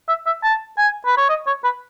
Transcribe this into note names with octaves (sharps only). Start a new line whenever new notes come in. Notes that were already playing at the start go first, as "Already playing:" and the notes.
E5
E5
A5
G#5
B4
C#5
D#5
C#5
B4